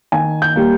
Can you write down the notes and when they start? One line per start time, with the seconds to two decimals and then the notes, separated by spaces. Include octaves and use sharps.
0.12 D#3 G#5
0.42 G6
0.56 G3 A#3